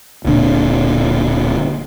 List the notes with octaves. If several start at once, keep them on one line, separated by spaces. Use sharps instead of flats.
D1 A#2 D3